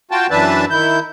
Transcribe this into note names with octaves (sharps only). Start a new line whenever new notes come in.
F4 F#4 G5 A5
F#2 E3 D4 B4 E5 A5
D#3 E4 G6